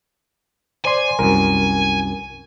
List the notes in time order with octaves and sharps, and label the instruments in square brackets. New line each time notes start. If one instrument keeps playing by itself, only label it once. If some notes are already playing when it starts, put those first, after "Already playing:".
[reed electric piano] C5 D5 C6 [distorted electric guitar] G#5
[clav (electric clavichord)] C2 F#2 [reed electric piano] A#4